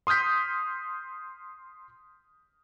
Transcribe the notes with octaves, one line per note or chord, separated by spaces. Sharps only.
C6 D#6 F6 G6 B6